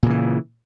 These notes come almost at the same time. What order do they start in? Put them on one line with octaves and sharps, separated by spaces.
A#2 C#3 E3